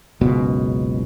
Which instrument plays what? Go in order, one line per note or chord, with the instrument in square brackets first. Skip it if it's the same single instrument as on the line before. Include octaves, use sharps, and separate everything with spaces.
[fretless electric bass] F#1 C#2 B2